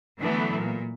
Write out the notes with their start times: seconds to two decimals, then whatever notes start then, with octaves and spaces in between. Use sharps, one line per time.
0.20 D3 E3 F#3 A3 B3
0.55 A#2